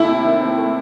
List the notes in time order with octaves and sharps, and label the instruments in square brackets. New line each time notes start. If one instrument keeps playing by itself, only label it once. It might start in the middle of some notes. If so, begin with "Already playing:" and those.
Already playing: [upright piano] D#2 A3 [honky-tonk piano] E4
[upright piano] C3
D#3
C4
A3